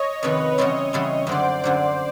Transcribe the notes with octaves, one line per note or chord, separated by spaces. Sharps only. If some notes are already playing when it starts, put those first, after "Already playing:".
Already playing: C#5 D#5
F2 C3 D#3 B4 C#5
C#3 E3 G3 C4 E4 C#5 D#5
C#3 E3 G3 C4 E4
F#2 D3 F#3 C5 D5
F#2 D3 F#3